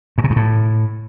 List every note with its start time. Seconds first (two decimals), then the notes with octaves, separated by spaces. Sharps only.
0.18 G#2
0.24 C3
0.30 G2
0.36 A2